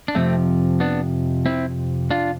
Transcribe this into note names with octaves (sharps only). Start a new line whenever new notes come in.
D4
F2 C3 F3 A3 C4
B3 D4
C4 E4
D4 F4